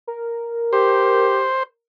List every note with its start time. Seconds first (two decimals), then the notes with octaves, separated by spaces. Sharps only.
0.07 A#4
0.73 G4 C5